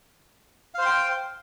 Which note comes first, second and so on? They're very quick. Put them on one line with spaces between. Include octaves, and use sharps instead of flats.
F5 C5 C6 G5